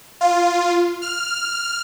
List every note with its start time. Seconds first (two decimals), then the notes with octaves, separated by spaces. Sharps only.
0.21 F4
1.02 F6